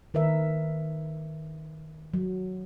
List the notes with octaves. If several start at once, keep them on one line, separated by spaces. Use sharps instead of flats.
D#3 A#4 B4 E5
F#3